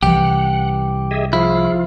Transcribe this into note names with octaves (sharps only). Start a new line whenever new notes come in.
C2 E3 G4 F#5 G5
G#4 D#5 E5
F3 E4 F4 G#4